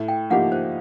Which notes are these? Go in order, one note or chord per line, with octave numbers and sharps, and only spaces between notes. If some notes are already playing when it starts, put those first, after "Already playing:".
Already playing: A2
G5
F3 A#3 D#4 G4 F#5
C5